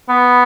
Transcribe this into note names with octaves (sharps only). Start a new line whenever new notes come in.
B3